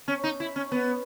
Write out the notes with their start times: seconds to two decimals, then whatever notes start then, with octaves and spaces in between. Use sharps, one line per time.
0.08 C#4
0.24 D#4
0.40 E4
0.56 C#4
0.72 B3